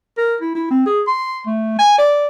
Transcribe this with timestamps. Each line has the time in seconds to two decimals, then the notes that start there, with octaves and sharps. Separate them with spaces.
0.18 A#4
0.41 E4
0.55 E4
0.71 C4
0.86 G#4
1.07 C6
1.47 A3
1.79 G#5
1.98 D5